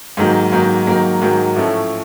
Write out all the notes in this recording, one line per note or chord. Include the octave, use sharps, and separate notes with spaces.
G#2 D#3 F#3 A#3
G#2 D#3 F#3 A#3
G#2 D#3 F#3 A#3
G#2 D#3 F#3 A#3
A2 F3 A3 C#4